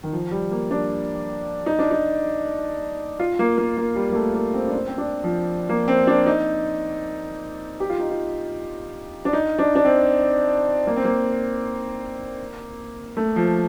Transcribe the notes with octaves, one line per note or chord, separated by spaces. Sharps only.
D#3
F3
G3
A#3
D4
D#4
D4
D#4
F4
A#3
A#3
A#3
G3
A#3
A3
A#3
C4
D4
C4
C4
D4
F3
A#3
C4
D4
D#4
G4
F4
D#4
F4
D4
D#4
D4
D4
C4
A#3
C4
A#3
A3
F3